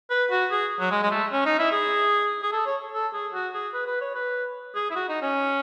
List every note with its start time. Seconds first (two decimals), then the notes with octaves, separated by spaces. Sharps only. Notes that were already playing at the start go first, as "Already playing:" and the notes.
0.10 B4
0.31 F#4
0.51 G#4
0.80 F#3
0.91 G#3
1.03 G#3
1.11 A3
1.32 C#4
1.46 D#4
1.59 E4
1.72 G#4
2.43 G#4
2.52 A4
2.66 C#5
2.93 A4
3.13 G#4
3.34 F#4
3.54 G#4
3.74 B4
3.87 B4
4.01 C#5
4.15 B4
4.75 G#4
4.91 E4
4.95 F#4
5.09 D#4
5.22 C#4